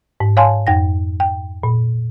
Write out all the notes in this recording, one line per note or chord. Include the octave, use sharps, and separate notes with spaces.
G#2
C#5 F5 G#5 A5 C6
F2 G5 A#6
G5
A#2